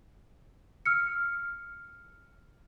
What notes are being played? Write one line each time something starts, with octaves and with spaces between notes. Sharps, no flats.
E6 F6 C#7